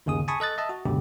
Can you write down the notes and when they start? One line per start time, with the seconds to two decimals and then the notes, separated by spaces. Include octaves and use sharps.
0.06 G1 D#2 C#3 G#4 D#6
0.28 G#5 A5 B5 C#6 D#6
0.40 A4 D#5 F#6 A6
0.58 D#5 E5 A5
0.69 F#4
0.85 C#2 F#2 B2 D3 G4